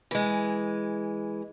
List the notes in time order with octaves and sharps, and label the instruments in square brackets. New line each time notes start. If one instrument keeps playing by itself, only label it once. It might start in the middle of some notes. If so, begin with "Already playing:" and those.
[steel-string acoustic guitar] E3 G#3